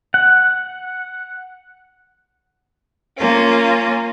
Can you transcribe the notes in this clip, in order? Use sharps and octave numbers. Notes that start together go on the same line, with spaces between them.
F#5
A#3 C#4 F4